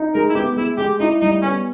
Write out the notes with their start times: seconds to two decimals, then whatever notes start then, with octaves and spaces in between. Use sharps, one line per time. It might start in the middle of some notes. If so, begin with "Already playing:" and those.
Already playing: D#4
0.14 G#3 A#4
0.29 E4
0.35 B3 G4
0.57 G#3 E4
0.78 G#3 G4
1.00 D#4 E4
1.22 G3 D#4
1.43 B3 C#4